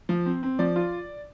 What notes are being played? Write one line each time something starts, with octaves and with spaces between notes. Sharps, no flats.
F3
C4
C4
F3 D5
F4